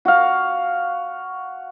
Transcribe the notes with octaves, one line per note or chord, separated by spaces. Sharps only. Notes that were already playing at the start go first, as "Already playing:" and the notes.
F#4 F5